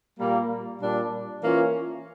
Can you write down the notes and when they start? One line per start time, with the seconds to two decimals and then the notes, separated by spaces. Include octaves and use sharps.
0.19 A#2 G3 A#3
0.80 A#2 G3 D4
1.41 E3 A#3 C#4 F4